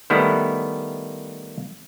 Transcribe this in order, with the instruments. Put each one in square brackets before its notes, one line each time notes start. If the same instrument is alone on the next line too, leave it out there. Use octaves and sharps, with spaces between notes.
[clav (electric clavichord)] D#3 G3 A3 B3 E4